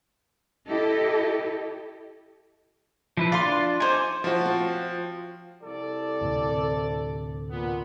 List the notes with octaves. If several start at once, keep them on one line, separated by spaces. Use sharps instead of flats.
E4 G4 A4 D#5
F3 E4 B4
D4 F4 D5 F5 C6
D#4 C5 G#5 D6
F3 E4 F#4 C5
C4 F4
C2 A4 D5
D2 A2 C3
A#2 B3